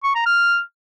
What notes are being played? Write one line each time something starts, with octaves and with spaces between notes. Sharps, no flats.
C#6
A#5
F6